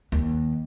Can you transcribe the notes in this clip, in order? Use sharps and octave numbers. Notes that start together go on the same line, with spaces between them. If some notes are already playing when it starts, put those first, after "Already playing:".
D#2